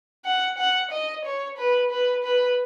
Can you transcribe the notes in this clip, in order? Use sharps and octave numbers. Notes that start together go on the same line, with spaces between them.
F#5
F#5
D#5
C#5
B4
B4
B4